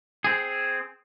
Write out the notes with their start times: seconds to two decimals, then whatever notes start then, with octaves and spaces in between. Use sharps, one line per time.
0.24 C4 G#4